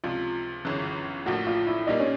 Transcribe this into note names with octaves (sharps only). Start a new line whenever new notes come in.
C#2 C3 F3 F4
G1 F#2 C#3 E3
A#1 A2 F3 A#3 F#4
F4
E4
A#2 G3 A#3 D#4
C#4